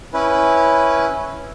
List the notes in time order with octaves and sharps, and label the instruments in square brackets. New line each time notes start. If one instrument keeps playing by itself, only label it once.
[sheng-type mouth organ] C#4 E4 B4